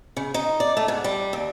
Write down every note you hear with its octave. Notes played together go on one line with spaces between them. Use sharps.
C#3
D#4
D5
A3
G#2
G3
D#2